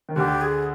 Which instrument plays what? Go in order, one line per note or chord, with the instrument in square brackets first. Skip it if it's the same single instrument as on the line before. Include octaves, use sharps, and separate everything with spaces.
[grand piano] D#3
[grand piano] D2 D3 [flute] G4
[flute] G#4